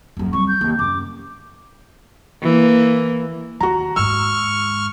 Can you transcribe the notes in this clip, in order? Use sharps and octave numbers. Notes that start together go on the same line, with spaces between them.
D#1 F#2
G3 C4 C#6
G6
D#2
F#2 D6
E3 A#3
D#2 F#4 A#5
D#2 G#2 C#6 E6 F6